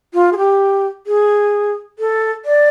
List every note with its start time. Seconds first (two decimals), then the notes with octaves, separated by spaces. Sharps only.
0.14 F4
0.33 G#4
0.37 G4
1.07 G#4
1.99 A4
2.45 D5